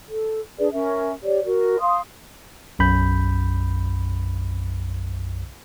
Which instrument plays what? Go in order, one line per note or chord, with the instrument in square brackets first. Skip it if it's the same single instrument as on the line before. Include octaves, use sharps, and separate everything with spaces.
[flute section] A4
D4 G#4 B4 D5
C#4 A#4 E5
G4 C#5 D5
F#4 A#4
F5 C6 D#6
[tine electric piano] B1 F#2 B5 G6